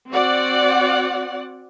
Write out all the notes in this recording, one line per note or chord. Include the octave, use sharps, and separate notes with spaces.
C4 F#4 D5 F#5